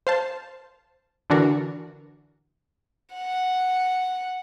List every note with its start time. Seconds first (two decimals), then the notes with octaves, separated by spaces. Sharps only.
0.07 C5 F5 A5
1.30 D3 E3 D4 F#4 A#4
3.14 F#5